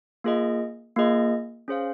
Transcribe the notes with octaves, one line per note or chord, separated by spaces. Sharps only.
A#3 F4 G#4 D#5
A#3 F4 G#4 D#5
C#4 G#4 C5 F5